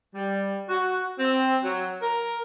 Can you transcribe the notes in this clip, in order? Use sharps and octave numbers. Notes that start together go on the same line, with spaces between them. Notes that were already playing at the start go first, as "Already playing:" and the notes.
G3
F#4
C4
F#3
A#4